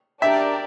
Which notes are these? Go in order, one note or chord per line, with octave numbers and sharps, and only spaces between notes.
D4 G4 A#4 D5 E5